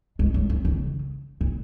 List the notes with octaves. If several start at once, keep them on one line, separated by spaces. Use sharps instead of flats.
G#3
F#3
F3
D#3
C#3
A#2